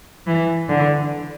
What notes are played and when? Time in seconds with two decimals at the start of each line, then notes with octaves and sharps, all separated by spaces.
0.27 E3
0.69 D3